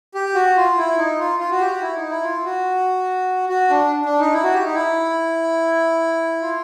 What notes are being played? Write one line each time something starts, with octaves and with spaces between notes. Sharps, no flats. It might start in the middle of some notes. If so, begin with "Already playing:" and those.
G4
F#4
F4
E4
D#4
F4
F4
F#4
G4
F#4
E4
D#4
E4
F4
F#4
F#4
D4
D4
D#4
E4
F#4
G4
D#4
E4
F4